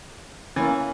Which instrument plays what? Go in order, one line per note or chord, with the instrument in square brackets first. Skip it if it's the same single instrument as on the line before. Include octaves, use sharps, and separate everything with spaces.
[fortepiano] E3 [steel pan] A#3 C#4